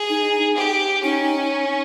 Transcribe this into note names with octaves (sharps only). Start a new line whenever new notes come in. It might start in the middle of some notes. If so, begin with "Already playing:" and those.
Already playing: G#4
D#4
G4
C#4 D#4